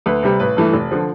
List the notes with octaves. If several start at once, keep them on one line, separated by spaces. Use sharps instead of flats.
D2 B4
C3 G3
A1 B4
G2 E3 A3
F1
D3 F3